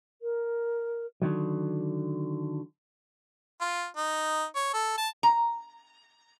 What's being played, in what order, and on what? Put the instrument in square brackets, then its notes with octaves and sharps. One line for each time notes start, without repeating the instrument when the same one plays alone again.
[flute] A#4
[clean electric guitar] D3 D#3 F#3
[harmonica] F4
D#4
C#5
A4
A5
[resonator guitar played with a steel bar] A#5